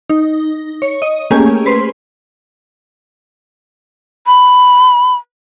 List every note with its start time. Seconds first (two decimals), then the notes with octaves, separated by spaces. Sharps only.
0.09 D#4
0.82 C#5
1.02 D#5
1.31 A3 A#3 C#4 G4 G#4 G#5
1.66 B4 C5 C6
4.27 B5